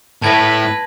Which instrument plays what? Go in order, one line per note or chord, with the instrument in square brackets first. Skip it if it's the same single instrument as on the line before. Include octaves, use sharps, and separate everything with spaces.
[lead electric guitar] A2 E4 [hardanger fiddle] B4 [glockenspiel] A5 G#6 A#6